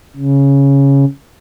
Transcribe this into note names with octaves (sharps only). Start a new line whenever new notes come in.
C#3